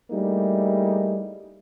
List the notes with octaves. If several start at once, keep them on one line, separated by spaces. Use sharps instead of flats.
G3 A3 A#3 D#4 E4 G#4